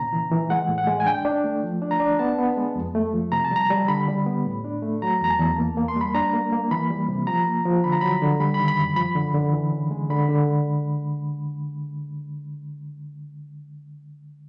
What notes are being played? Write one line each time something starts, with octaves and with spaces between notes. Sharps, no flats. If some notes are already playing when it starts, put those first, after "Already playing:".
Already playing: A#2 C#3 A#5
E3
E3
G#3 F#5
A2
F#5
G#3
G#5
D4 G5
D4
A3
F3
D4
A#5
D4
B3 A5
B3
G#3
F2
A3
F3
C3 A#5
A5
G3 A#5
G3
D3 B5
G3
B3
A2
D4
A3
F#3 A#5
E2 A#5
A5
E2
A#3
A#3
C6
G3 B5
D4 A#5
A#3
A#3
E3 B5
G3
C3
F3 A#5
A#3
F3
D3 B5
A#5
F#3 B5
D3
G3 B5
B5
D#3
B5
F#2
F3 B5
D3
D3
E3
C#3
G#3
D3 B5
D3